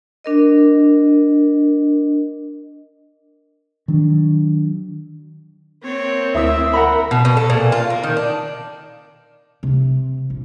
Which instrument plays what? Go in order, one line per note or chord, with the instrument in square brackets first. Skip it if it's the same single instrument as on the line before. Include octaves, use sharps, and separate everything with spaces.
[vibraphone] D4 A#4 D#5
[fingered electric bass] D#3 F#3 D4
[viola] A#3 C4 [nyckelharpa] C#5
[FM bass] D2 [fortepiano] E4 D#6 [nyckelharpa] E5
[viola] A#4 [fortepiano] F#5 A#5 B5
[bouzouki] B2
B2
A4
A#2
F4
A#3
D#3
D4
[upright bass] C3
A#1